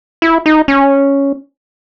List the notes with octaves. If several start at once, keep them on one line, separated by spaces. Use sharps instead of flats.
E4
D#4
C#4